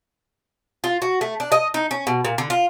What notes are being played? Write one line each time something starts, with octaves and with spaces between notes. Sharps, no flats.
F4
F#4
A3
D4
D#5
D#4
C#4
B2
A#2
D3
F4